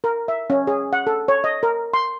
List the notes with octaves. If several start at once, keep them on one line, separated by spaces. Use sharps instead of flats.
A#4
E5
C#4
G#4
F#5
A4
C#5
D#5
A#4
C6